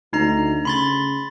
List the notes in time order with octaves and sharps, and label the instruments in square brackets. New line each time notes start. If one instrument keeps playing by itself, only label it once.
[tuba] D2 [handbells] D#4 A#5
[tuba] C#3 [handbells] B5 C6 A6